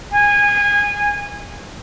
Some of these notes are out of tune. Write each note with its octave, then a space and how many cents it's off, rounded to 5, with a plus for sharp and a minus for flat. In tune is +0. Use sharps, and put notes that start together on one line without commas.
G#5 -20